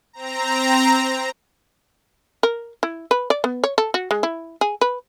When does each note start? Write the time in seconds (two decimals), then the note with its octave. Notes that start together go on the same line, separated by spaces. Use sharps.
0.13 C4 A#5
2.43 A#4
2.83 E4
3.11 B4
3.30 D5
3.44 B3
3.64 C#5
3.78 A4
3.94 F#4
4.11 G#3
4.23 E4
4.61 G#4
4.81 B4